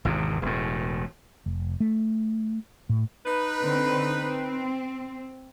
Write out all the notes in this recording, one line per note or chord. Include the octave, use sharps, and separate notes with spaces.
G#1 E2 C3
E1 A2
F1
A3
A2
D#4 B4
D3 C4
C4